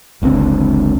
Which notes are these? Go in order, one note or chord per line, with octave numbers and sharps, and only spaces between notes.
F#1 C#2 D3 C4